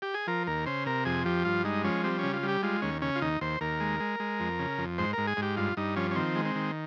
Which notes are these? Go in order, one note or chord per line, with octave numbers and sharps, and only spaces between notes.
G4
G#4
F3 A#4
D#2 A#4
C#3 C5
C3 A#4
F2 G#4
F3 G4
G2 F4
G#3 D#4
F3 C#4
G3 C4
C#3 C#4
F4
G3
G4
G#3 F4
D#2 C#4
C#3 C#4
F4
D#2 D#4
D#2 C5
D#2 A#4
G#3
G#3
G#3
F2
C#3
F2
G#2 C5
G#2 A#4
G#4
G#2
G4
G2 F4
G2 D#4
F3 C#4
C#4
D#3 C4
G#3
C4
D#3